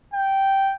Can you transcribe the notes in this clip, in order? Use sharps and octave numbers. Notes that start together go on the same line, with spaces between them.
G5